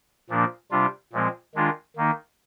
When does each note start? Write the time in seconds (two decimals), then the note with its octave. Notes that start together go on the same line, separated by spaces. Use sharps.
0.30 A#2 F3 A#3 D4
0.71 C3 G3 D4 F4
1.13 A#2 F3 G#3 C4
1.55 D#3 G#3 D4 F4
1.96 D#3 A#3 D#4